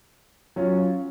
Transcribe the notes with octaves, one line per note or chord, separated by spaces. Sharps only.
F#3 C#4 F4